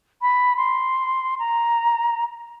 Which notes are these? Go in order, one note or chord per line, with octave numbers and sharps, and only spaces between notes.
B5
C6
A#5